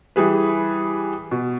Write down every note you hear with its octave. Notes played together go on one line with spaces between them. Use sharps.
E3 G3 G#4 B4
B2